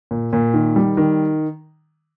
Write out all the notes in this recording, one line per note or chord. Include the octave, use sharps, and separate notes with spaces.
A#2
A#2
D#3
G3
D#3